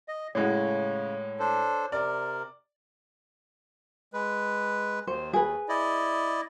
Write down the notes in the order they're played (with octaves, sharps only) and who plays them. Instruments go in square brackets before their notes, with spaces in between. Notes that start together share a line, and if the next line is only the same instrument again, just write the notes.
[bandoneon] D#5
[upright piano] A2 G#3 F#4 [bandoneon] C#3 [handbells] C#5
[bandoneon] D4 A4 C5
[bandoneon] C3 A#4 [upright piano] D5
[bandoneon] G#3 B4
[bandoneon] D#2 [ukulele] C5
[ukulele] G#4 B4
[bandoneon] E4 D5 D#5